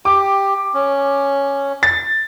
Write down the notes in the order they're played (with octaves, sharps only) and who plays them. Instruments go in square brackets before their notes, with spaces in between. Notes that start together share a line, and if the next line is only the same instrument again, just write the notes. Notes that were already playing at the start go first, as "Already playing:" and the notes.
[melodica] G4 [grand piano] D6
[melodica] C#4
[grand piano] A6